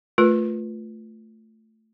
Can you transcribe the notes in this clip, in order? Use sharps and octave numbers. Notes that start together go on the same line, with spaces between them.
A3 F4 A#4 B4